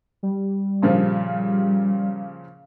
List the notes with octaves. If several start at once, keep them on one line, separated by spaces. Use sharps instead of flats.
G3
A#2 C#3 F3